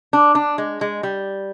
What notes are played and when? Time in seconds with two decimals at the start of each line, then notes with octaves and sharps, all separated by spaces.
0.13 D4
0.35 D4
0.58 G#3
0.81 G#3
1.03 G3